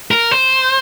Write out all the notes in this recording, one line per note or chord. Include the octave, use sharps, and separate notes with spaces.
A#4
C5